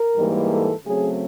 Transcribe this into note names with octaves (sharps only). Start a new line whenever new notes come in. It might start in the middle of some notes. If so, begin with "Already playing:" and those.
Already playing: A#4
G#2 E3 G3 A#3
A4
C#3 F#3 A3 C4 G#4